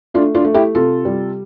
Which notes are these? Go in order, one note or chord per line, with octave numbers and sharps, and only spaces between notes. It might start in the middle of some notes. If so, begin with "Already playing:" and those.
A3 D4 F4
D4 F4
A3
E4 G4
C3 F4 A4
G3